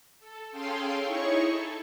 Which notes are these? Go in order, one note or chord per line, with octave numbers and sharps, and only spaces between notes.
A4
C#4 G#4 A4 F5 G5 C6
D#4 E4 G#4 C#5 C#6
A4